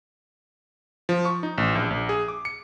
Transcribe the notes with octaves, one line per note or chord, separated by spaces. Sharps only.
F3
C#6
D#4
A1
A#1
A#1
G#4
D6
C#7